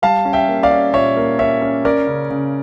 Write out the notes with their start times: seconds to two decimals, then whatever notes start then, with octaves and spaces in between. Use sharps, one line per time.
0.02 G3 F5 A5
0.25 C#4
0.33 E5 G5
0.48 A#3
0.63 D5 F5
0.71 C#4
0.93 A#2 C#5 E5
1.17 A#3
1.39 C#4 C#5 E5
1.61 C#4
1.85 C#4 A#4 D5
2.07 C#3
2.30 C#3